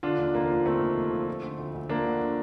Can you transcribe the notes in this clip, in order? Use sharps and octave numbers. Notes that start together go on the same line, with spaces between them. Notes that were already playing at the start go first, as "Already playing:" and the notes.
D3 D4 F4
D#2
F1 A#3
F3
D3 A3 C4
D#2
F1
F3
F3
D3
D2
D2
F3 A#3 D4
D3